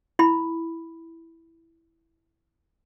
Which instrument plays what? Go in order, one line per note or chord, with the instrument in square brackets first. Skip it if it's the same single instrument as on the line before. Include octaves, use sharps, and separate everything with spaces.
[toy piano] E4 B5